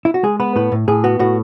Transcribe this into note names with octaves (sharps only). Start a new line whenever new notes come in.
E4
F#4
G#3 G#4
B3 B4
A2 B4
A2
A2 G#4
B3 F#4
A2 F#4